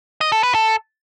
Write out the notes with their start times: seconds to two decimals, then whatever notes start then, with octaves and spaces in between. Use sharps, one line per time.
0.21 D#5
0.32 A4
0.43 B4
0.54 A4